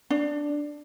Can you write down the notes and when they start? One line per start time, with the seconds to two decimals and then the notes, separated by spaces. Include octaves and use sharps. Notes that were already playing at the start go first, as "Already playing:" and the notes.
0.10 D4